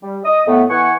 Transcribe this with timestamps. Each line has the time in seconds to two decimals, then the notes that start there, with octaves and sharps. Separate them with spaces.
0.03 G3
0.25 D#5 D#6
0.47 A2 A3 B3
0.70 E3 F#5 G#5 C#6